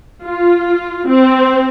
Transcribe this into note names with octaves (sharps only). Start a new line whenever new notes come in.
F4
C4